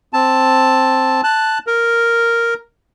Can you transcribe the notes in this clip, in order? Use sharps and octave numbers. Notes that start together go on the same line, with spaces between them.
C4 A5
A5 F#6
A#4